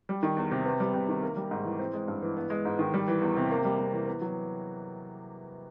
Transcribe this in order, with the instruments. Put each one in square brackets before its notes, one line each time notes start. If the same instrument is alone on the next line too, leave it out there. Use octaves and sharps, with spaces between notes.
[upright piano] G3
D#3
E2
C3
B3
G3
C3
D#3
A#3
G3
G#2
E3
C4
G#3
G2
E3
B3
G#3
G#2
D#3
G3
E3
E2
C3
A#3
G3
C3
E3
B3
F#3